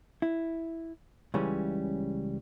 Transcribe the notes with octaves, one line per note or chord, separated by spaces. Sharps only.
E4
C#2 C#3 E3 G3 C#4